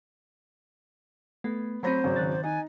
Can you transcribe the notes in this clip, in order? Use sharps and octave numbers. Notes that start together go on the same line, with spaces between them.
A3 B3
F#3 A3 C4 C5 B5 A#6
G#1 C#3 F#3
D#3 F#6 A6
D#4 G#5